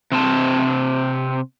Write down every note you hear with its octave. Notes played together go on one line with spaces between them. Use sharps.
C3 C4 A5